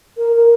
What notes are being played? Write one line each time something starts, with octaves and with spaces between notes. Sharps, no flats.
A#4
A#4